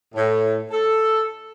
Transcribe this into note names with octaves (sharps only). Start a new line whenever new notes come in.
A2
A4